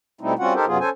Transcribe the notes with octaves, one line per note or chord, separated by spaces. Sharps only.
B2 G3 A3 C4 D#4 E4
G3 C4 C#4 F4 F#4 F#5
D#4 G4 A4 A#4 C5
F#2 C3 F#3 B3 F4 G#4
C#4 A4 C5 G#5